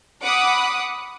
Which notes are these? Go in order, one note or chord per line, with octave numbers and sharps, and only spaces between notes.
F#5 B5 D6 D#6 F#6